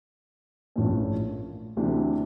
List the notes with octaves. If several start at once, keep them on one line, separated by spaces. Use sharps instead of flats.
A#1 A2 F3 A3 C#4
D2 C3 E3 A3 D4